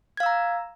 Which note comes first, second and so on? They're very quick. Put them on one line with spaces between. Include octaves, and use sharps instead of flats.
G#6 F5 E6 A#5